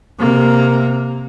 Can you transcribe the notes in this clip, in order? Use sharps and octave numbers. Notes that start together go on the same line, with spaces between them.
C3 A#3